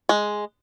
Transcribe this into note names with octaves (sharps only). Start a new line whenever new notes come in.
G#3